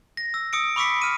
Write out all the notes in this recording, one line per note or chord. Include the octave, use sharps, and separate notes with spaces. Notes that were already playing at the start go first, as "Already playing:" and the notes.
A#6
E6
D#6 E6 C#7 D7
B5 C#6 D6 E6 B6 C#7
F6 D#7